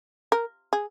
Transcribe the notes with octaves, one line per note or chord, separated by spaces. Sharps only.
A#4
G#4